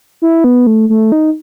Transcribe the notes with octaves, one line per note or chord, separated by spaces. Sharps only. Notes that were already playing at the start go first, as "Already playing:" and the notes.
E4
B3
A3
A3
D#4